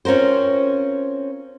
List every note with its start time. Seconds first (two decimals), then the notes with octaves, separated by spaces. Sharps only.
0.05 C4 C#4 F4 A#4 C5